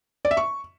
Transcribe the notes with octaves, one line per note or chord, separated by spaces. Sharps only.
D5
E5
C#6